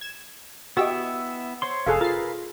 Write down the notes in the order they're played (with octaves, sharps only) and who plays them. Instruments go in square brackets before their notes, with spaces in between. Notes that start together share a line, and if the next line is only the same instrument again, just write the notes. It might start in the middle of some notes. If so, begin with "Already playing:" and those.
[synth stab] G#6 E7
[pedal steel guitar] B3 E4 E5 [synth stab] F#4 G4 D#5
[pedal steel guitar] C5 C#5 C6
[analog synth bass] F1 [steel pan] G#4 A4 F5
[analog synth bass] F4 [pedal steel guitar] A#4 B4 [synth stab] A6 C7